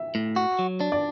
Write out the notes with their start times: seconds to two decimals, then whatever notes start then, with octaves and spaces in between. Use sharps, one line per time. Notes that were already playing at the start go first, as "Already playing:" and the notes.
Already playing: E5
0.15 A2
0.36 F#4
0.59 F#3
0.80 D4
0.92 D5